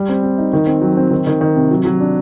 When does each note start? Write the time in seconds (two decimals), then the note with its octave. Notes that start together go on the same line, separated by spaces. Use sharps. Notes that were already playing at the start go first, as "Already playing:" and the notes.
Already playing: G3
0.09 C4
0.23 C4
0.38 D#4
0.53 D#3
0.67 C4
0.81 F#3
0.97 C4
1.11 D#3
1.27 D#3
1.41 D#3
1.56 C3
1.71 F#3
1.85 F#3
2.00 D4